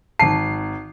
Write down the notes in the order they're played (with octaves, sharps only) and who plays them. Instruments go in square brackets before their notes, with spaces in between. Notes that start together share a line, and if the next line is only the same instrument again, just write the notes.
[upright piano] G#1 C7 [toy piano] A5